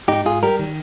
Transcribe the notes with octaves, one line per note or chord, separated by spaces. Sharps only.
G#2 D#4 G4
G#2 F4 G#4
G3 G4 A#4
D#3